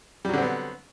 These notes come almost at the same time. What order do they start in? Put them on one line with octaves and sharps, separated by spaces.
G3 F#3 D3 C4 B3